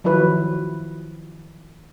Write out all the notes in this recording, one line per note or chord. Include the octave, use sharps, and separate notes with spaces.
D#3 F3 F#3 E4 B4